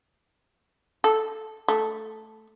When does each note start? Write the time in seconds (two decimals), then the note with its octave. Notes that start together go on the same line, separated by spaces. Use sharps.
1.04 A4
1.68 A3